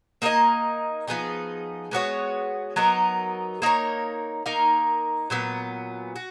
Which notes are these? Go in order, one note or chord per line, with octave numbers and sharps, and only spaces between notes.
A#3 D#4 A#4 D#5
F3 B3 D#4 G#4
G#3 B3 F#4 C#5
F#3 B3 D#4 A#4
A#3 D#4 A#4 C#5
A#3 D#4 A#4 F5
A#2 F#3 B3
F#4